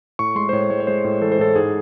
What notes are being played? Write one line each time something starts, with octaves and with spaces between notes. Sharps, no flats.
A2 C#6
G#3 C6
C5
A2 C#5
G#3 C#5
C#5
G#3 C5
A2
E3 A4
C5
A2 A4
G#2 G#4